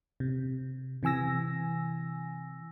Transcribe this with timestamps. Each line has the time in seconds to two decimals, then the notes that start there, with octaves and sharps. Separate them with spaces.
0.20 C3
1.03 C3 E3 G#5 E6 A#6